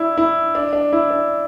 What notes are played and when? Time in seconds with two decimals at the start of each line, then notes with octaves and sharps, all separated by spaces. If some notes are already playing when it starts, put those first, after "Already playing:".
Already playing: D4 E4
0.18 E4
0.55 D4
0.73 D4
0.93 E4
1.11 D4